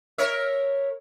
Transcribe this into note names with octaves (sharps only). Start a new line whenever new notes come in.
A#4 C#5 E5